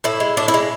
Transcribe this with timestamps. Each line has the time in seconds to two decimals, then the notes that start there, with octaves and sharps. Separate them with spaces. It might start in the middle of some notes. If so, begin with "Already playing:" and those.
0.04 A2 E4
0.20 G#3
0.37 A2 D4
0.48 E4
0.54 G#3